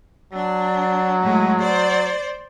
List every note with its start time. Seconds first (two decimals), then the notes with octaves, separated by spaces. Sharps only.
0.33 F#3 D4
1.23 A2 G#3
1.62 C5 D5